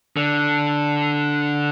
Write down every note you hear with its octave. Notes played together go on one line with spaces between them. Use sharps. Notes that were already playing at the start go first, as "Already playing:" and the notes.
D3